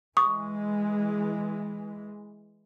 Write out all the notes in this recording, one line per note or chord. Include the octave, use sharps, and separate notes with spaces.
E3 G#3 C#6 D#6